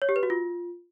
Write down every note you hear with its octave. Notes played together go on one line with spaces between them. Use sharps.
C#5
G4
B4
F#4
F4